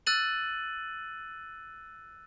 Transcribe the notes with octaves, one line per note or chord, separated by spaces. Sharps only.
E6 F#6 A6 D#7 F#7